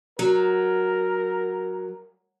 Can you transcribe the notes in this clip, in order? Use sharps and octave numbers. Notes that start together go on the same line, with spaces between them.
F#3 A#4